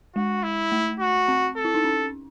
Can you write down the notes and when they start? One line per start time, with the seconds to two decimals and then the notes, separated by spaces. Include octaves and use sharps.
0.15 G#3 F#4
0.43 E4
0.72 A3
1.00 F#4
1.28 C4
1.57 A4
1.65 E4
1.74 D#4
1.84 C#4